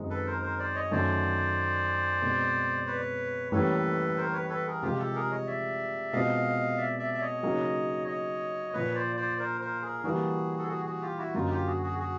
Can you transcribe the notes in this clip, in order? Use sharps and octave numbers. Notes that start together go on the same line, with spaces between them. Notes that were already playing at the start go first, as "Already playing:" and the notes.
Already playing: F#2 D#3 G#3 C4 D#4
A4 B4
A#4 C5
A#4 C5
C5 D5
C#5 D#5
F#2 D#3 F#3 A3 C5 D5
B2 G#3 C4
B4 C#5
A2 E3 G3 A#3 C#4 A4 B4
A#4 C5
B4 C#5
A4 B4
G#4 A#4
C3 F3 G#3 F4 G4
G4 A4
G#4 A#4
C#5 D#5
D5 E5
B2 G#3 C4 F4 D#5 F5
D5 E5
D5 E5
E5
C#5 D#5
C#3 F#3 A#3 D#4 G#4
C#5 D#5
A#2 F3 A#3 B4 C#5
C5 D5
C5 D5
A#4 C5
A#4 C5
G#4 A#4
E3 G3 A#3 F#4 G#4
A4
F#4 G#4
F#4 G#4
F4 G4
E4 F#4
F#2 D3 F#3 A#3 D#4 F4
F4 G4
F#4 G#4
F#4 G#4
F#4 G#4